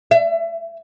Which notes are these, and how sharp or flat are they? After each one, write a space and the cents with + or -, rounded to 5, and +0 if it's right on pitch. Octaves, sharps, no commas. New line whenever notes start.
E5 +30